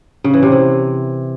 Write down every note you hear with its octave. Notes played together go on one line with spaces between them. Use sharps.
C#3
E3
C3
E3